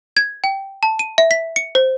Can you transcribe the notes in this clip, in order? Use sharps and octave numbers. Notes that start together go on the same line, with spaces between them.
G#6
G5
A5
D#7
E5
B6
C#7
C5